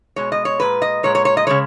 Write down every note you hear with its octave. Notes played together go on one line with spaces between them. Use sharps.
B2 G#3 C#5
D#5
C#5
A#2 G#3 B4
D#5
A#2 G#3 C#5
C#5
C#5
D#5
C#3 E3 G#3 C#5